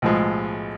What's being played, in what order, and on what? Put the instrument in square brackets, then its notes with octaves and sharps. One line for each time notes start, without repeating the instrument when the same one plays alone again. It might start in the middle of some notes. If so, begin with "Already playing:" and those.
[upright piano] B1 A2 F3 G#3